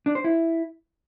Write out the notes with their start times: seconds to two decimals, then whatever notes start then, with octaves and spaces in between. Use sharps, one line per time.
0.06 D4
0.15 C5
0.24 E4